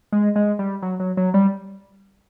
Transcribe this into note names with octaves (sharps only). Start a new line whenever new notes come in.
G#3
G#3
G3
F#3
F#3
F#3
G3